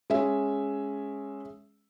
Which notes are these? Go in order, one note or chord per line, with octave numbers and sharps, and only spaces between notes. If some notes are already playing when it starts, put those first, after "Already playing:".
G#3 C#4 E5